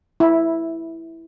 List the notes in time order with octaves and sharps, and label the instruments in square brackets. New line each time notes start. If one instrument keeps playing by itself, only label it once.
[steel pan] E4